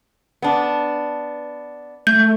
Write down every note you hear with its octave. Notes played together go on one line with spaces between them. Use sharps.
B3 D4
A3 G6